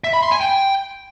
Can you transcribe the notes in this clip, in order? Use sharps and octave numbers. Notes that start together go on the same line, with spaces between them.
E5
B5
C6
G#5
G5